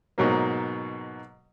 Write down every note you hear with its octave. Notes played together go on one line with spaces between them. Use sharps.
G#2 B2 F#3 A#3